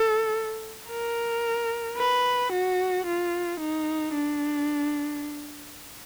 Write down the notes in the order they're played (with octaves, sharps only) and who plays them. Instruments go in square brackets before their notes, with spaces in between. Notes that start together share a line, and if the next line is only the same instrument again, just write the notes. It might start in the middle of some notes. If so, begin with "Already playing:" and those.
Already playing: [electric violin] A4
A#4
B4
F#4
F4
D#4
D4